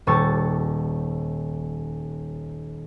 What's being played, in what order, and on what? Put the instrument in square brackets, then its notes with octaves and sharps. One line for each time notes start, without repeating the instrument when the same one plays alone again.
[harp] D#1 G3 A4 C#6 A6